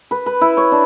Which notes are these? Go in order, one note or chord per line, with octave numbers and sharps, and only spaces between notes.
B4
B4
E4
C#5
D4